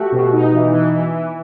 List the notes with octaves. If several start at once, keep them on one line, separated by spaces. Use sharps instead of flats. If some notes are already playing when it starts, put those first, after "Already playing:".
Already playing: A3 F#4 G4
B2
D#4
E3
E3
E3
E3